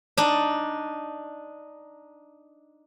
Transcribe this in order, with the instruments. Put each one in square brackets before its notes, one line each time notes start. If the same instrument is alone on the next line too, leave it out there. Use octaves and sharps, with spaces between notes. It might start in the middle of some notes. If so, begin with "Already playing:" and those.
[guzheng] D4 D#4